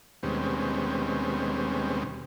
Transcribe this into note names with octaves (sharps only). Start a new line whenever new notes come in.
D#2 B2 G3 G#3 C4 C#4